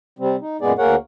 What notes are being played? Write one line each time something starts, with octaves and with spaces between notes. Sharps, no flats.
C3 G3 C4
D#4
F#2 A#2 G#3 B3 G#4 D5
D2 A#3 G#4 A#4 C#5 F#5